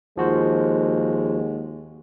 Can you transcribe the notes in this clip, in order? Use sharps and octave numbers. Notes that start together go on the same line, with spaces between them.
D#2 F3 G#3 F#4 C5